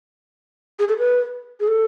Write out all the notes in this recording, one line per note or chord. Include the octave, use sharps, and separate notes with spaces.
G#4
A4
B4
G#4
A4